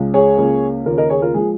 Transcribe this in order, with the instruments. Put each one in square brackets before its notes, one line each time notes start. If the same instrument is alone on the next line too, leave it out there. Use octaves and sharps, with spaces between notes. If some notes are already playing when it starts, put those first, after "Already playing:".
Already playing: [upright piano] C#2 C#3 G#3
G#4 C#5
C#2 C#3 A#3
D#2 C#3 A#3 F4 A#4
A#4 D#5
G#4 C#5
F4 A#4
F3 G#3 G#4